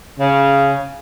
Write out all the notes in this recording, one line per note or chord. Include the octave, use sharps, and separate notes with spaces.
C#3